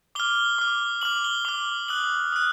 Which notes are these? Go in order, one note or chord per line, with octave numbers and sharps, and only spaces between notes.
D6 F6 G7
D6 F6
D6 F6 F#7
G7
D6 F6
D#6 F#6 F#7
D#6 F#6